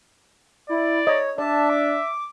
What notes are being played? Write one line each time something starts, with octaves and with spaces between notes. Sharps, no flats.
E4 D5
C#5 D#5
D4 D5 E5 A5
D6